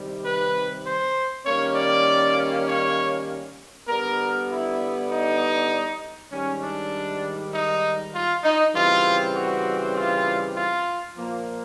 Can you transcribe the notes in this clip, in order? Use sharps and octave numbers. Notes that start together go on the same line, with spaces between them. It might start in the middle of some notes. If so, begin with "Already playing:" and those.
Already playing: C3 D#3 G3 C4
B4
C5
D#3 G3 A#3 C#4 C#5
D5
C#5
D3 G3 B3 A#4
E4
D#4
G#2 D#3 G3 C#4
D4
D#4
F4
D#4
C#3 E3 G3 C4 F4
F#4
F4
F4
A#2 F3 A#3